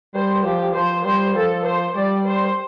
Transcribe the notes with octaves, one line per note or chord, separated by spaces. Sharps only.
G3 C5
F3 G4
F3 C5
G3 C5
F3 A4
C5
G3 D5
C5